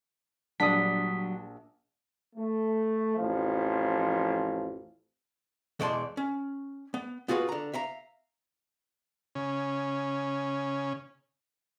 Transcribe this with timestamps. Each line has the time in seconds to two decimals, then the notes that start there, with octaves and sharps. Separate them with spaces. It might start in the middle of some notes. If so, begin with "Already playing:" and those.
0.60 A#1 F#3 G3 D4 A5 D#6 B6
2.35 A3
3.17 A1 F2 F3
5.80 E2 B2 G#3 D5 A5 C6
6.17 C#4
6.94 B3
7.28 B3 F4 F#4 G#4 B4
7.49 D3 A#5
7.74 E5 F5 A#5
9.35 C#3 C#4